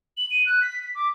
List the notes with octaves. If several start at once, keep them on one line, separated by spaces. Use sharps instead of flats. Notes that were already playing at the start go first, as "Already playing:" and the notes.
F#7
D#7
F#6
B6
B6
D6